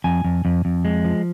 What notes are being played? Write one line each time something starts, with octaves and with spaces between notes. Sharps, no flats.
F2 G#5
F2
F2
F2
G#3
F3